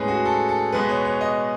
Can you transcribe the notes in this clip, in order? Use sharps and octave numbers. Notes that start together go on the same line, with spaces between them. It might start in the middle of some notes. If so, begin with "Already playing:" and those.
Already playing: A2 G#3 C#4 G#4 B4
F#4
A4
A4
B2 G#3 B3 B4
C#5
C#5
D#5